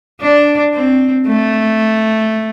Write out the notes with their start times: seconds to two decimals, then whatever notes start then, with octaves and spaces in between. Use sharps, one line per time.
0.21 D4
0.74 C4
1.27 A3